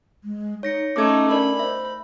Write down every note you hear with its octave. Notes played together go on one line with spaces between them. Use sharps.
G#3
D#4 C#5 A#6 C#7
A3 C#4 D#4 D6 G#6
D4 A#4 D5 B5
C5 E5